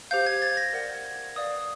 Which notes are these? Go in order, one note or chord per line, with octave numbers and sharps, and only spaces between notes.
G4 C5 F5 G6
G#6
A6
A#6
A#4 D5 F#5
G#6
B4 D5 F5 D#6